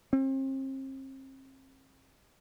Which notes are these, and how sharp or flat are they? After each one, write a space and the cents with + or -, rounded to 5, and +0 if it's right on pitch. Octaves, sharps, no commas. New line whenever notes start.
C4 +40